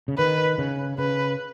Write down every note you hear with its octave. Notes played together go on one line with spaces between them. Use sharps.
C#3
D#3 B4
C#3
C#3 B4